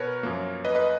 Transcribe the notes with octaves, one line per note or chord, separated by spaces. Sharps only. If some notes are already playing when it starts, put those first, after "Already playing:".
Already playing: B2 A#4 B4 C#5
F#2 F3 A#3
B4 D#5
B4 D#5